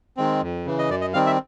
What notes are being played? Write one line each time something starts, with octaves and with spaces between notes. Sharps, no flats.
D#3 G#3 C4
F2
C#3 E3
D#5
F#2 D5
D#5
D#3 G3 C4 F5
E5